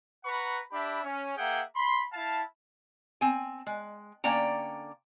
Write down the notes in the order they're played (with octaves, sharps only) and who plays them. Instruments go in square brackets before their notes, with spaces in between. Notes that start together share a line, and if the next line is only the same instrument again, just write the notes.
[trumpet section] B4 F#5 A#5 B5 C#6
D4 G4 E5 B5
C#4
A#3 G#4 E5 F#5 G5
B5 C6
E4 F5 A5
[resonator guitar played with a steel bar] C4 G#5
G#3
D3 A#3 C#4 D5 G5 A#5